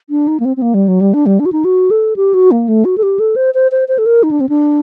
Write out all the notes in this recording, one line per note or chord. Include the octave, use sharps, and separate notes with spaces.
D4
D#4
A#3
C4
C4
A#3
G3
F#3
G3
D4
G3
D4
F#4
D#4
F#4
A4
G4
F#4
A#3
A3
F#4
A4
G4
A4
C5
C5
C5
C5
A4
A#4
D#4
D4
C4
D4